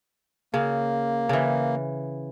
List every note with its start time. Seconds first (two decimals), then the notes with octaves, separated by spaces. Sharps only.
0.54 C#3 A#3
1.29 C#3 E3